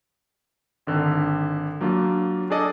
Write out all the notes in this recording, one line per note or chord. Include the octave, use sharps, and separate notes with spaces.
G#1 D3 D#3
F#3 A#3 D4 F4
D4 G#4 A4 D5 D#5